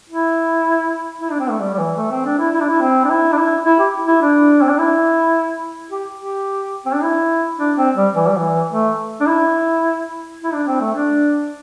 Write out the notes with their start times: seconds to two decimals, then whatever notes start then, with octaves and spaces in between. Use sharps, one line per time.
0.10 E4
1.21 E4
1.31 D4
1.40 C4
1.50 A3
1.60 G3
1.74 G3
1.79 E3
1.97 A3
2.11 C4
2.25 D4
2.39 E4
2.54 E4
2.61 D4
2.69 E4
2.81 C4
3.04 D4
3.10 E4
3.32 D4
3.38 E4
3.66 E4
3.79 G4
4.07 E4
4.22 D4
4.62 C4
4.70 D4
4.79 E4
5.90 G4
6.18 G4
6.86 C4
6.94 D4
7.03 E4
7.59 D4
7.78 C4
7.96 G3
8.15 E3
8.27 G3
8.38 E3
8.71 A3
9.21 D4
9.27 E4
10.44 E4
10.54 D4
10.68 C4
10.81 A3
10.95 D4